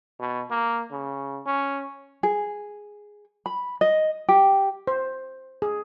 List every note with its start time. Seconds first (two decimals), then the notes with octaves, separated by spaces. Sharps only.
0.20 B2
0.50 A#3
0.91 C#3
1.46 C#4
2.23 G#4
3.46 B5
3.81 D#5
4.29 G4
4.87 C5
5.62 G#4